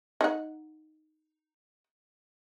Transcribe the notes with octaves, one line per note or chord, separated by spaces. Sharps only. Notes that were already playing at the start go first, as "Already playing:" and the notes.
D#4 F#5